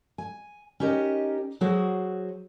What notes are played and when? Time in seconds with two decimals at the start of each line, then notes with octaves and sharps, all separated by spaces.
0.18 G#5
0.80 C#4 D#4 G4 A#4 D#5
1.61 F#3 F#4 G#4 C5